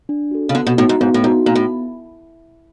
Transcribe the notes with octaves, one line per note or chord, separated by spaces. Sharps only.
D4
F#4 A4
C#3
D3 B3
B2
A2 D#4 F#4
G#2
G#2 B3
A2
G#2 D#4 F#4
A#2 B3
A2